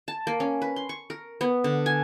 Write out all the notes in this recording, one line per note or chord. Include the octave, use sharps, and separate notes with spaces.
A5
A#3
C#4
B4
C6
C#6
A#4
B3
D3
G#5